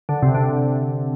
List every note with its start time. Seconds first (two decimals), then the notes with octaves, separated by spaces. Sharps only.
0.09 D3
0.23 C3
0.35 D3